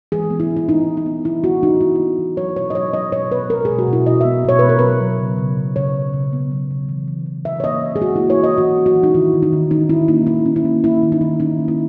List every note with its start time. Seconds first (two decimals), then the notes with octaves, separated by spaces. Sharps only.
0.12 E3 G#4
0.30 B3
0.40 E4
0.50 B3
0.57 E4
0.68 B3 D#4
0.88 B3
0.97 D#4
1.06 B3
1.24 E3 E4
1.44 B3 F#4
1.63 E3 D#4
1.81 B3 E4
1.95 B3 E4
2.19 E3
2.37 F#3 C#5
2.56 B2 C#5
2.70 D#5
2.75 F#3 C#5
2.93 F#3 D#5
3.12 B2 C#5
3.32 B3 B4
3.50 B2 A#4
3.65 B2 G#4
3.79 F#4
3.87 B2
3.93 E4
4.06 B2 D#5
4.21 B3 E5
4.45 B2 C#5
4.59 B3 B4
4.69 A#4
4.79 F#3 B4
5.01 F#3
5.20 C#3
5.38 C#3
5.57 C#3
5.76 C#3 C#5
5.95 C#3
6.14 C#3
6.33 B3
6.51 F#3
6.71 C#3
6.89 E3
7.08 E3
7.26 E3
7.45 E3 E5
7.60 C#5
7.64 A#3 D#5
7.83 E3
7.96 G#4
8.02 E3 F#4
8.16 A#3 E4
8.30 C#5
8.39 E3 D#5
8.58 E3 F#4
8.77 C#4
8.86 F#4
8.95 E3
9.03 D#4
9.14 D#3 E4
9.33 D#3
9.43 D#4
9.53 D#3
9.71 D#3 D#4
9.89 C#4 E4
10.08 A#3 D#4
10.27 D#3 E4
10.46 C#4
10.56 E4
10.65 A#3
10.84 A#3 E4
11.02 D#3
11.12 D#4
11.21 D#3 E4
11.40 C#4 D#4
11.59 A#3
11.68 E4